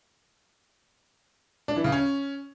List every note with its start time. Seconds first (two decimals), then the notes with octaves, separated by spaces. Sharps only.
1.68 D4
1.76 E3
1.84 C#3
1.92 C#4